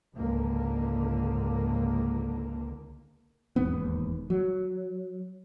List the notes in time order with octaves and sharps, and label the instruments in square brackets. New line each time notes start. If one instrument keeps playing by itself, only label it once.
[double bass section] C#2 G#2 D3 A#3
[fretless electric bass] E1 D#2 G#2 B3
F#3